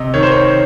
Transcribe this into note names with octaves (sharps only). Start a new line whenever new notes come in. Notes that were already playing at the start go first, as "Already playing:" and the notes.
Already playing: C3 D#5
D#3 C#5
C5
C#5